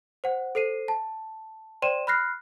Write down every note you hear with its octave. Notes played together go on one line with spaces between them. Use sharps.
C5 F#5
A4 C5 C7 D#7
A5
C5 D5 G5 C6 D#7 E7
B5 F6 F#6 A#6 C7